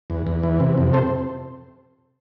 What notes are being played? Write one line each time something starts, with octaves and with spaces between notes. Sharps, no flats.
E2
E2
E3
C3
F2
A4 C5